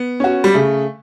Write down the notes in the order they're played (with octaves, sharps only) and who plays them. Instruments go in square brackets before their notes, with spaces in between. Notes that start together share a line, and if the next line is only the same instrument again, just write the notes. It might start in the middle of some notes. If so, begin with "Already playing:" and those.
Already playing: [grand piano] B3
[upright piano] C#4 F#4
[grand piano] G3
[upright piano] C#3 [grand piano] A3